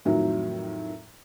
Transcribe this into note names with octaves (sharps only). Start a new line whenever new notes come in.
F2 A2 D#3 F#3 E5